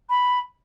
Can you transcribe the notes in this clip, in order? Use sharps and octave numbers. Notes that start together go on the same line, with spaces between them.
B5